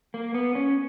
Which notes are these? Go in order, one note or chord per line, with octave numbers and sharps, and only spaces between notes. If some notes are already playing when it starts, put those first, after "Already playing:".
A#3
B3
C#4